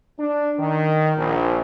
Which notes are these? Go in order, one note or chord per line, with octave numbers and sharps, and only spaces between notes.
D4
D#3
A#1